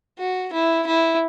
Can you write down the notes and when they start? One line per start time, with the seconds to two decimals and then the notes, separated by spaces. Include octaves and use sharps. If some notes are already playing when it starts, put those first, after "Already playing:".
0.19 F#4
0.53 E4
0.87 E4